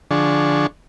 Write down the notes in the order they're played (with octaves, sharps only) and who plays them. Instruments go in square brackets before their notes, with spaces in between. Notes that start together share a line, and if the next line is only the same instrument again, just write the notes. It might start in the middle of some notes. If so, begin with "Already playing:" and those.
[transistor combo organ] D3 F3 D4 G#4 C#6